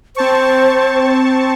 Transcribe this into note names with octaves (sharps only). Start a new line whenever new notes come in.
C4 C5 A5 C#6